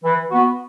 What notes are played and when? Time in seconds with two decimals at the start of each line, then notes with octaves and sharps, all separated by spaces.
0.04 E3
0.31 B3 F#4